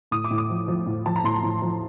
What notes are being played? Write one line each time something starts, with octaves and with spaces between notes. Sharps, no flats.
A2 D#6
D6
A2
D#6
F3
F3
A2
F3 A5
A#5
A2 C6
A2
F3